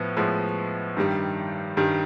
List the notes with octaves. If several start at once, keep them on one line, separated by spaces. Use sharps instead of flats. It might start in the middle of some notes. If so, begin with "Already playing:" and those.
Already playing: A2 F3 B3
A2 F3 G#3 B3
G2 D#3 G3
G2 D#3 G3